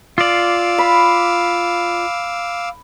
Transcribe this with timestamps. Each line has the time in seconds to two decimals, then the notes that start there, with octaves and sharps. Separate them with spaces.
0.18 F4 D5 F5 D6 E6
0.78 B5